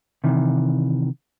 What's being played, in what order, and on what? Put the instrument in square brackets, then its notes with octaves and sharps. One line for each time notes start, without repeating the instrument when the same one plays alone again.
[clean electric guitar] C3 D#3 E3